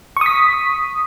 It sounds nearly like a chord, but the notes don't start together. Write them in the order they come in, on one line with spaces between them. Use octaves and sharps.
C#6 D#6 B6